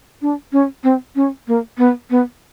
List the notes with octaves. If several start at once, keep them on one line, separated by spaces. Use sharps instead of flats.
D4
C#4
C4
C#4
A#3
B3
B3